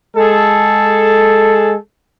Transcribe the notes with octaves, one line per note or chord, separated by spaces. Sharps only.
G#3 G#4 A4